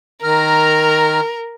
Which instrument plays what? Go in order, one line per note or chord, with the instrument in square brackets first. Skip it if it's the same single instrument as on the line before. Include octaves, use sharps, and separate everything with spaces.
[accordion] D#3 A#5 F6 [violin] A#4